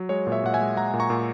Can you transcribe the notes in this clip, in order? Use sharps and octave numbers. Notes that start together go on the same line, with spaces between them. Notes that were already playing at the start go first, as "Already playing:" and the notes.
Already playing: F#3
G#3 C#5
A#2
C#5 E5
A#2 F#5
E5 G#5
G#3
G#3 F#5 A#5
A#2
A#5 C#6
A#2